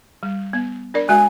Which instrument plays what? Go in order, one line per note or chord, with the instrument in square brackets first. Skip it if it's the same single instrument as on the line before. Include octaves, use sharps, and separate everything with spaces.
[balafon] G3
B3
D4 A#4 D5
[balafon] G#3 F#4 E5 [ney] G#5